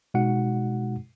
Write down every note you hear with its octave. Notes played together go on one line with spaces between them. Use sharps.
B2 G#3 D#4 F#4 F#5 C#7